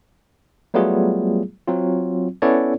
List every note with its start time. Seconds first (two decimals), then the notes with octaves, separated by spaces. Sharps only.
0.74 F#3 G3 A3 B3 F4 G#4
1.67 F#3 C4 F4
2.42 B3 C#4 E4 A4 C#5 D5